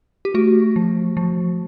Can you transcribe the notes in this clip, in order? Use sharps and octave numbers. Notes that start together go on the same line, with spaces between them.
G4
A3 F#4
F3
F3